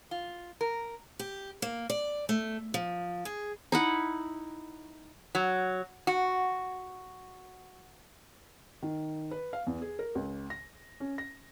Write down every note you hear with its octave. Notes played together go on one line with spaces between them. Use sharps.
F4
A#4
G4
A#3
D5
A3
F3
G#4
D#4 E4 F#5
F#3
F#4
D#3
B4
F5
E2
G#4
A#4
C#2
A#6
C#4
A#6